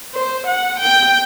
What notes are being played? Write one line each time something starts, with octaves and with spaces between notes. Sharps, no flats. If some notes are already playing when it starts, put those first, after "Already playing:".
C5
F#5
G5